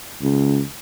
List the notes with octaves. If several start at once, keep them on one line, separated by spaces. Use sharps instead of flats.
C#2